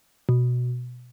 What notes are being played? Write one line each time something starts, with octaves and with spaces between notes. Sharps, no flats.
B2